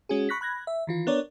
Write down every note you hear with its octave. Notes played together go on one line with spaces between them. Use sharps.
G#3 C#4 F#4 G#4
B5 C#6 F#6 A#6 B6
B5 F#6 G#6 A#6
E5
D#3 E3 F4
B3 D4 A#4 C#5 D5